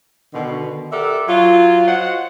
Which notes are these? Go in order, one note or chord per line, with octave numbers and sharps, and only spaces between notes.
B2 D3 D#3
G4 A4 A#4 D5 E5 F#5
F#3 F4
F#4 C5 D#5 F#5